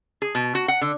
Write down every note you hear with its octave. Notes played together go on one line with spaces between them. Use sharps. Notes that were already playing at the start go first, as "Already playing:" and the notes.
G#4
B2
F#4
F#5
D3